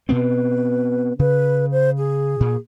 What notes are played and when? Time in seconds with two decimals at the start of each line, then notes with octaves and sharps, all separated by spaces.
0.09 B2 B3 C4 B4
1.19 C#3 B4
1.72 C5
1.98 G#4
2.40 A#2